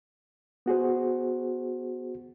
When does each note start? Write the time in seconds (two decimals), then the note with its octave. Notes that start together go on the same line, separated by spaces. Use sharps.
0.66 B3 F#4 G#4 C5